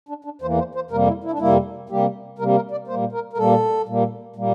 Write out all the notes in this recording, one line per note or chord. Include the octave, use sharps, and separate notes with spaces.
D4
D4
E2 E3 A#3 C5
C5
C5
F2 C3 G3 A#3 A#4
E4
E4
D4
F2 C3 G3 A#3 E4
C3 G3 A#3 G4
C3 G3 A#3 A#4
A#4
D5
A#2 G3 A#3 C5
A#4
A#4
A#2 G3 A#3 A4
A#2 G3 A#3
A#2 G3 A#3